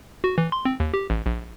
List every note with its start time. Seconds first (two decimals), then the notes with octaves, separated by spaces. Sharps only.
0.24 F#4
0.38 E3
0.52 C6
0.65 C4
0.80 D#2
0.94 G4
1.10 A1
1.26 A#1